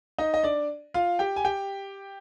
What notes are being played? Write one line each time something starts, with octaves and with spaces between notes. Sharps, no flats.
D#4 D#5
D#5
D4 D5
F4 F5
G4 G5
G#5
G4 G5